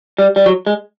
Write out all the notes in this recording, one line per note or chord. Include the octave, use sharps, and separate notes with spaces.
G3
G3
F#3
G#3